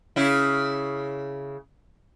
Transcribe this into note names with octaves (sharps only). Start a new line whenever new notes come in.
C#3 E4